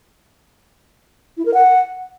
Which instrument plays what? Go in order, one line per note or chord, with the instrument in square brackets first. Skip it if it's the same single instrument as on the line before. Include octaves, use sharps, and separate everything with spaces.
[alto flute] E4
A#4
F#5